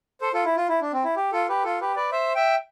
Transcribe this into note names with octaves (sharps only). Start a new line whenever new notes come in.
A4 C5
F4 A4
E4
F4
E4
D4
C4
E4
G4
F4 A4
G4 B4
F4 A4
G4 B4
B4 D5
C5 E5
E5 G5